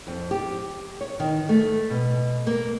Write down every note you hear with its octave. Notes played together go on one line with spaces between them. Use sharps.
F2
G4
C#5
D#3
A3
B2
A#3